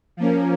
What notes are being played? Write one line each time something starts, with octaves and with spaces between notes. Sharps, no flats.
F3 A#3 C#4